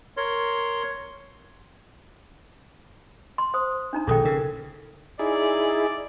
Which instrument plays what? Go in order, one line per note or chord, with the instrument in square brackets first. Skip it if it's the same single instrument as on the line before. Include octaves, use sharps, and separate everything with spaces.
[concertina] A#4 C#5 C6
[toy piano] C6
C5 D#6
D4 D#4 A#5
[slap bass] A#1 B2 D#3 [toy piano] G#4 A4 G5
[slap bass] C#3 [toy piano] A#4
[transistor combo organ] D#4 E4 G#4 [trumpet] D5